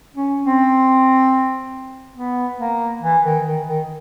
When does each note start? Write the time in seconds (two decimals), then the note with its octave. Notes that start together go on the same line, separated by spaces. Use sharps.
0.16 C#4
0.45 C4
2.16 B3
2.59 A#3
3.03 E3
3.24 D#3
3.45 D#3
3.67 D#3